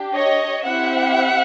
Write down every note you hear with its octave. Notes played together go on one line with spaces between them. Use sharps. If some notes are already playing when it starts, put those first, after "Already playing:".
Already playing: D4 G4
C#5 D#5
C4 E4 G4 E5 F#5